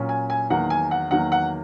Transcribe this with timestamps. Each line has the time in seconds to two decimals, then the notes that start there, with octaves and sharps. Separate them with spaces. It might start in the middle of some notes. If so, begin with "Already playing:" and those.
Already playing: A#2 F#3 C#4
0.09 G#5
0.30 G#5
0.50 E2 D#3 F#3 A#3 F#5
0.70 G#5
0.91 F#5
1.11 E2 D#3 F#3 A#3 F#5
1.32 F#5